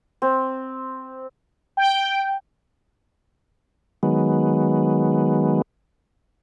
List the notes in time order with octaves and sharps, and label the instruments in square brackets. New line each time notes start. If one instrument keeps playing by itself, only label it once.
[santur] C4
[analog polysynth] G5
[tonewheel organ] D#3 F#3 G#3 B3